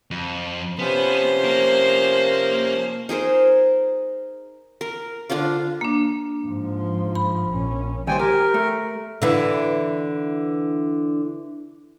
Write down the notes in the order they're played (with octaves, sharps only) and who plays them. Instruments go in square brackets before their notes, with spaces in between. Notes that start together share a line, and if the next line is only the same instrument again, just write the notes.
[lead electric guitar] F2
[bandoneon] C3 F3 C#4 [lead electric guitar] B3 [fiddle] C5
[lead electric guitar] A#3 A#4
[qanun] D#4 G#4 A#4 C5
A#4
D3 D4 F4 F5
[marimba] A#3 D4
[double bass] G#2 F3
[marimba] B5
[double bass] A#1 C#4
[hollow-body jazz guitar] D#2 G3 C5 [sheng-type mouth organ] G5 G#5
[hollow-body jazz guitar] G4 [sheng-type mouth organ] A#4
[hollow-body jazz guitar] A3
[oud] D3 E3